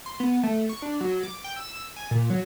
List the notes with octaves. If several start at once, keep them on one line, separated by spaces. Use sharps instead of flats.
C6
B3
A3
C#6
D4
F#3
D6
G5
E6
G#5
A#2
F#3